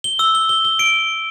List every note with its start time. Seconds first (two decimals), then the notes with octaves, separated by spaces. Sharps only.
0.04 G7
0.19 E6
0.35 G7
0.49 G7
0.65 G7
0.79 D7